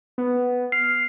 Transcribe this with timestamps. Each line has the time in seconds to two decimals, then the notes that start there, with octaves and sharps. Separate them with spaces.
0.18 B3
0.72 F6 C7